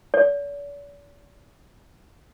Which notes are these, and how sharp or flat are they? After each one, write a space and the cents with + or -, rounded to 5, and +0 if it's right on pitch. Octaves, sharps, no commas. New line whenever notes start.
D5 -45